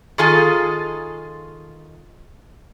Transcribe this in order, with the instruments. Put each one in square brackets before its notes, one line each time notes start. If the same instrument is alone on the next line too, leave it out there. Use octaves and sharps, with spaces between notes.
[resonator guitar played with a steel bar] D#3 F4 G#4 A4 G#5